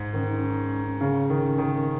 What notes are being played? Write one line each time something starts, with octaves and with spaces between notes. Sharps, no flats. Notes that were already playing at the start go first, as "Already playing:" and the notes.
Already playing: G#2
D#3 C#4
D#4
C#4
D#4
C#3 C#4
D#3
D#3